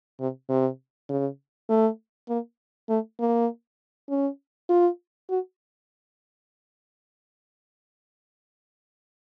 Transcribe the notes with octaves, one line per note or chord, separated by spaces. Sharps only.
C3
C3
C#3
A3
A#3
A3
A#3
C#4
F4
F#4